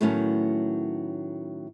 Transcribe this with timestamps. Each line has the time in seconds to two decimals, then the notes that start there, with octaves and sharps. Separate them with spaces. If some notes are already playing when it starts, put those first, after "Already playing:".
0.01 A2 D#3 F#3 A3 B3 C#4